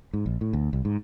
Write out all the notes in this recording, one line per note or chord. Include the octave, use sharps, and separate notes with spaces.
G#2
A#1
A2
D2
C2
G#2